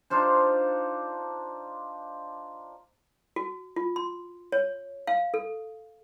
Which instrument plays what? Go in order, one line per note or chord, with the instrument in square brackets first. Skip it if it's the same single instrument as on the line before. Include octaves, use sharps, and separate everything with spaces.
[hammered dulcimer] D4 D#4 F4 C5
[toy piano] F#4
F4
C6
C#5
F5
A4